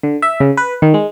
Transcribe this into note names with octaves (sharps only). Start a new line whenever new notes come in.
D3
E5
C#3
B4
D#3
G#3